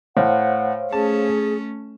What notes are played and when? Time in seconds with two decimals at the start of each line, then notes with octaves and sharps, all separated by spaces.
0.17 A2 C5 C#5 F5 F#5
0.93 A3 C#4 G#4 A5